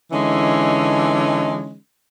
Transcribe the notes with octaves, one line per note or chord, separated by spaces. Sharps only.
D3 E3 G#3 C#4 D#4